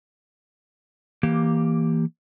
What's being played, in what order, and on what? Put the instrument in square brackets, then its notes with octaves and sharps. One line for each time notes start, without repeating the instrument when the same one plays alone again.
[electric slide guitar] E3 A#3 G4